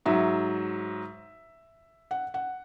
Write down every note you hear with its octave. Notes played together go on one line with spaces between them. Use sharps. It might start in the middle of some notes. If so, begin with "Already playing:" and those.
G#2 F#3 E5
F#5
F#5